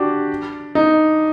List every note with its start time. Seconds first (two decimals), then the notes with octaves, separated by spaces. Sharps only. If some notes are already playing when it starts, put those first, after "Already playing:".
Already playing: D4 F#4 G4
0.75 D#4